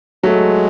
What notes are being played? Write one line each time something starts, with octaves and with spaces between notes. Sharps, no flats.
F#3 G#3 A3